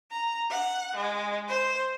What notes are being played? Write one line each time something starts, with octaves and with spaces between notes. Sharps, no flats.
A#5
F#5
G#3
C5